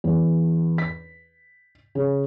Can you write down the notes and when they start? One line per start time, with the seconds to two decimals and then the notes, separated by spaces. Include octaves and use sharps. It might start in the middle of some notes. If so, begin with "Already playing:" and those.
0.04 E2
0.78 B6
1.95 C#3